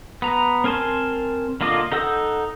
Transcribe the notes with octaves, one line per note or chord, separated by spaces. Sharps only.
B3 A#5
C4 A#4 G#5 A5 C6
D3 A#3 F4 D#5 D6
D#4 A4 F#5 E6 G6